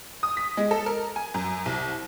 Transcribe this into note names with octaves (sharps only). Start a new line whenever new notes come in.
D#6
B6
G#3
A4
A#4
G#5
F#2
C2